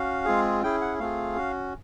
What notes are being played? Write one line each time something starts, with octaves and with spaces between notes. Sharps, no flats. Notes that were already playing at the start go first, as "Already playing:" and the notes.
Already playing: C#4 F#4 F5
G#3 C4 F4 G#4
C#4 E4 G#4 G5
F#5
A3 C4 F4 G#4 F5
C#4 F#4